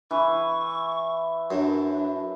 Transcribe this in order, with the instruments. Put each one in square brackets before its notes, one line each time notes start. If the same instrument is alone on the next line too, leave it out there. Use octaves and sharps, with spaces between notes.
[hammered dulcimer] E3 [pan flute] C#6
[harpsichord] F#2 [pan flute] D4